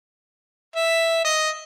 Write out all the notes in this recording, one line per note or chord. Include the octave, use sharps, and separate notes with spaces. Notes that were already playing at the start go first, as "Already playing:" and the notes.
E5
D#5